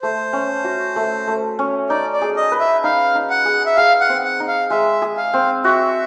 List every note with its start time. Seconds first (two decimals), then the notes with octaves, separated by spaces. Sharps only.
0.02 A3 C5
0.33 C#4
0.64 F#4
0.96 A3
1.27 A3
1.59 C#4
1.89 D#4 D5
2.13 D5
2.22 G#4
2.37 D#5
2.52 B4
2.60 E5
2.84 D#4 F5
3.15 D#4
3.30 F#5
3.45 G#4
3.66 E5
3.77 G#4 F5
4.00 F#5
4.09 C4
4.24 F#5
4.40 D#4
4.48 F5
4.70 G#3 E5
5.02 G#4
5.17 F5
5.34 C4
5.64 F#4 E5